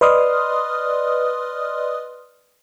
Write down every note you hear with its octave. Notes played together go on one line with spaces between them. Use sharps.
B4 D5 D#5 C6 D#6 F6